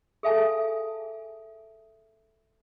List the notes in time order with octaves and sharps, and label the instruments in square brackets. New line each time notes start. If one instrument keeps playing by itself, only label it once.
[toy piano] G#4 A4 E5 F5 G#5 A5